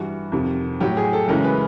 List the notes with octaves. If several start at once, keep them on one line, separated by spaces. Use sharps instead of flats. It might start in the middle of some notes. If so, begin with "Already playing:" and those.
Already playing: G2 E3 G3 F#4
F2 C3 D#3
A2 F#3 G4
G#4
A4
F#2 C#3 E3 G#3 A#4
B4